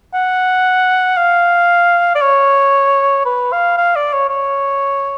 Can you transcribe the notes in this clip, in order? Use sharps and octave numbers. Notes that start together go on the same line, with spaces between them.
F#5
F5
D5
C#5
B4
F5
F5
D5
C#5
C#5